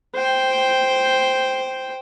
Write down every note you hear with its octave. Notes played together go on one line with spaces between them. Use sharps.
C5 G5